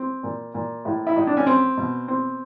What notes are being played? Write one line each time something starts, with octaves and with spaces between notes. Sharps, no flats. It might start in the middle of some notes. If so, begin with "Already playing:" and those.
Already playing: C4
A#2
A#2
A2
E4
A2 D#4
D4
C#4
C4
B2
C4